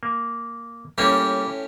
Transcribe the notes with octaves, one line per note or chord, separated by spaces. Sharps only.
A#3
A2 G3 A#3 C#4 G4